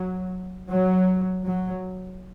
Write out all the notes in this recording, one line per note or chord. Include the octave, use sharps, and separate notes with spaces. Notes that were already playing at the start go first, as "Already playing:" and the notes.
Already playing: F#3
F#3
F#3